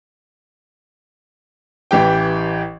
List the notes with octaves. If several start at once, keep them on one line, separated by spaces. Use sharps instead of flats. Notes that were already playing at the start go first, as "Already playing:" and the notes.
A1 E3 G4 G5